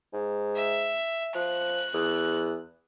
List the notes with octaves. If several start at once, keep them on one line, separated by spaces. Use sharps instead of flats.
G#2
E5
F3 F#6
E2